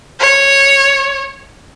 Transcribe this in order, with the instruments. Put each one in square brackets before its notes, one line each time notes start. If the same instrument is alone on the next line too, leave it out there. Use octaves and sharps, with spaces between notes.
[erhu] C#5